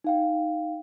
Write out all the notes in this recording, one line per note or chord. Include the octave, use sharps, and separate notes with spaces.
D#4 F5 G5